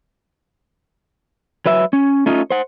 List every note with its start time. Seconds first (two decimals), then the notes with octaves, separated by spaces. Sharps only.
1.66 F#3 B4 E5
1.93 C#4
2.26 A3 C#4 D#4 F4
2.51 C5 F#5